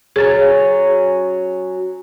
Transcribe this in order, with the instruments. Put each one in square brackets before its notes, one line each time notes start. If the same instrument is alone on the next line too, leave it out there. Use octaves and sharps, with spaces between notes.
[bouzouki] F#3 C#4 [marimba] G#4 A6